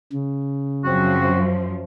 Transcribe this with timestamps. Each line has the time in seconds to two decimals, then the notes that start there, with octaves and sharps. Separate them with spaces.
0.13 C#3
0.84 F#2 F3 C4 F#4